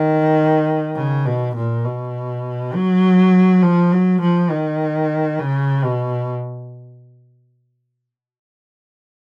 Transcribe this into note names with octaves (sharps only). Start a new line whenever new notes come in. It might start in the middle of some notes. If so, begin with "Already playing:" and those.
Already playing: D#3
C#3
B2
A#2
B2
F#3
F3
F#3
F3
D#3
C#3
B2